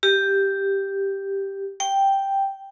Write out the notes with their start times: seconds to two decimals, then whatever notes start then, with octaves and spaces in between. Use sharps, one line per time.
0.03 G4
1.80 G5